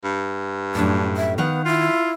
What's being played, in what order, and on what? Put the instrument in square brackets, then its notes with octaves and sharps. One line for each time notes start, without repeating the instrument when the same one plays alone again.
[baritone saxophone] G2
[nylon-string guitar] F#2 A2 [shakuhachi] D4
[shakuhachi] E5
[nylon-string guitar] D#3 F5 F#5 [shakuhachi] B3
[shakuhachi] E4 [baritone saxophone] F4